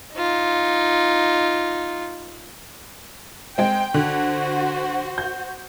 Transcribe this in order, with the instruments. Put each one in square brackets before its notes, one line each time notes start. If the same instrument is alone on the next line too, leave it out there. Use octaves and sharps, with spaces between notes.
[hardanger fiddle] D#4 F4
[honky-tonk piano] G#3 C4 [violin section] G5
[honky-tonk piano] D3 [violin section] F#4 C5
[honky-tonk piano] G6